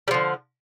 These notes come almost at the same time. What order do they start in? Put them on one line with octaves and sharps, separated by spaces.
G3 F3 D3